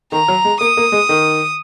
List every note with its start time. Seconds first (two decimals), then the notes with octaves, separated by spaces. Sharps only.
0.12 D#3 A#5
0.28 F#3
0.45 G#3
0.61 A#3 D#6
0.77 A#3
0.92 G#3
1.09 D#3